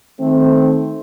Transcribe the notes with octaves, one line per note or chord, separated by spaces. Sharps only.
D#3 A3 C4